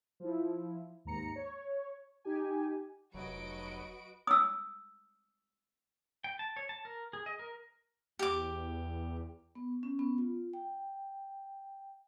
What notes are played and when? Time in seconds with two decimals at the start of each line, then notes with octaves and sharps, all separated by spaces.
0.20 F3 E4
1.05 D#2 G#2 A#5 C#7
1.36 C#5
2.25 D#4 G4 G#5
3.14 F1 F#3 F#4 B4 D#5 D7
4.27 D#6 E6
6.24 G5
6.39 A5
6.56 C#5
6.69 A5
6.85 A#4
7.13 G#4
7.26 D#5
7.39 A#4
8.19 E2 G4 D6
9.55 B3
9.83 C#4
9.99 B3
10.18 F4
10.53 G5